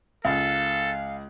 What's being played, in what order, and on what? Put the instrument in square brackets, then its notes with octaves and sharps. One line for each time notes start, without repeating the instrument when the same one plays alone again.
[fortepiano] C#2 [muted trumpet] A4 [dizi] F5